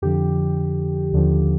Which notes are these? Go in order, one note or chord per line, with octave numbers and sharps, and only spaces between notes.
F2 D3 F3 G4
D#2 D3 F3